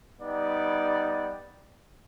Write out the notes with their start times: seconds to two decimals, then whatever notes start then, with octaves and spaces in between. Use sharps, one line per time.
0.20 G3 B3 D#4 D5